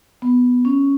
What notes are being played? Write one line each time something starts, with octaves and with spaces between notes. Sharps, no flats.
B3
C#4